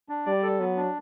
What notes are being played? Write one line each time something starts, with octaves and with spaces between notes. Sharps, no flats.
D4
G3 D5
A4
F#3 B3
D4